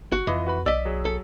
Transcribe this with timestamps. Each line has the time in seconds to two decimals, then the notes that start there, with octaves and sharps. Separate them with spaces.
0.12 G1 F#4
0.27 F2 E3 F4 B4 D#5
0.47 F#4 B4 B5
0.66 B1 D5 D#5 E6 B6
0.85 F#3 G#4
1.05 A4